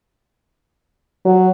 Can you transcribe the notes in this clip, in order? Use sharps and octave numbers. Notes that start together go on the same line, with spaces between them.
F#3